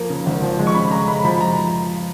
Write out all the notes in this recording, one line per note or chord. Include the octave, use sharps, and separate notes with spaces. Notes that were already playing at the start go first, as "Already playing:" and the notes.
Already playing: F3 A#3
C#3
G#1
F3
G#3
C#6
C#3 B5
G#3 A#5
G#3 B5
F3 B5
F3 A#5